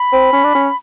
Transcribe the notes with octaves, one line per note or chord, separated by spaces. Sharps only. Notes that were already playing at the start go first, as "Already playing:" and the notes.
Already playing: B5
C4
C#4
D4
C#4